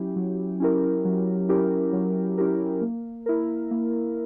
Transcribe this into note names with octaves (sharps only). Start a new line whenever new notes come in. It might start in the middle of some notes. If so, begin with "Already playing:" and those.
Already playing: F#3 C#4 E4 G4
F#3
C#4 E4 G4 A#4
F#3
C#4 E4 G4 A#4
F#3
C#4 E4 G4 A#4
A#3
E4 A#4
A#3